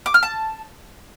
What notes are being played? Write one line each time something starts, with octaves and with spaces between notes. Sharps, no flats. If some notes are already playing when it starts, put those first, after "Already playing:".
D6
F6
A5